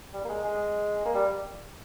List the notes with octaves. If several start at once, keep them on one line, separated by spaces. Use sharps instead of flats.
G3
A#3
G#3
G#3
A#3
G3